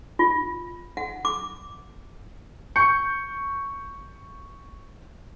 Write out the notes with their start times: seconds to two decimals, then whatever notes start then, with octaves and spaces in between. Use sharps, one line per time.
0.19 F4
0.97 F#5
1.25 D6
2.76 C#6 G6 C#7